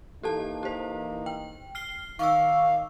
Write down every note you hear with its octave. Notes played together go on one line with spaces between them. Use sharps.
E3 A#3 D#4 G4 A4 A5
G4 C5
G5
F6 C7 G7
D#3 D#4 F5 C#6 D6 E6